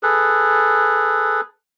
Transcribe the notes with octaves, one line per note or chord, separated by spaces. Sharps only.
G#4 A4 B4